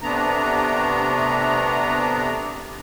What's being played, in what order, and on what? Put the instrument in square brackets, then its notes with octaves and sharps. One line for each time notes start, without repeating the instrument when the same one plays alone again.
[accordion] C3 A3 B3 D4 A#5